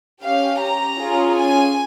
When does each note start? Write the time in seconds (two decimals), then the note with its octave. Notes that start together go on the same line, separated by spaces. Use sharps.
0.22 C#4 G4 F5
0.61 A#5
0.99 C#4 F4 G#4
1.36 G#5